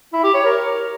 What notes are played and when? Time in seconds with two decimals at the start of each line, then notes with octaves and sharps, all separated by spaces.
0.13 E4
0.24 G4
0.34 C#5
0.45 A#4